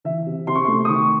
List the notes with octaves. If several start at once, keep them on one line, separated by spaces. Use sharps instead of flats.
E3 E5
C3
C3 C6
C#6
A3 C6
D#6
D#3 C#6